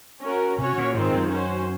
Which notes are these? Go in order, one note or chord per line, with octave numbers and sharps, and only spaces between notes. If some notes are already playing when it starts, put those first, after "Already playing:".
C#4 F#4 A#4
C3 C#4 F#4 C#5
A#2
G#2 D#3 G#3 C4 F4
F#2
C#4 F#4 C5